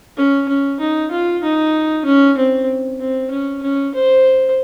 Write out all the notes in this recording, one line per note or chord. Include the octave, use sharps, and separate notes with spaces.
C#4
C#4
D#4
F4
D#4
C#4
C4
C4
C#4
C#4
C5